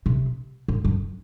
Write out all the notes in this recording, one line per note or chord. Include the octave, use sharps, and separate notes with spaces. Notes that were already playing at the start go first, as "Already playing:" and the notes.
C3
G#2
F#2